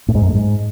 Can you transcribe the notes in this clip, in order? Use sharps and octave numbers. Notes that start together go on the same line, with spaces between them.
A2
G#2
F#2
A2
G#2